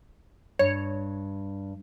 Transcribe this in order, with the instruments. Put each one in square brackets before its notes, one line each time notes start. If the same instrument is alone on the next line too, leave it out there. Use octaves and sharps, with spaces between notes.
[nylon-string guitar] G2 [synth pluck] C#5